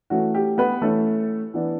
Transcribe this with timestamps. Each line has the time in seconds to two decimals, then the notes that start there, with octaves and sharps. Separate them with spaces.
0.10 E3 A3 C#4 F#4
0.34 G4
0.58 B3 B4
0.82 E3 A3 C#4 A4
1.54 E3 B3 D4